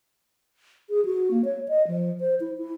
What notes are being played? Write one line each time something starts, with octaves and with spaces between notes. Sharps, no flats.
G#4
F#4
A#3
C#5
D#5
F3
C5
E4
E4